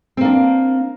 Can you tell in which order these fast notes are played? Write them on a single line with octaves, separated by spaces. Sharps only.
C4 A#3 D4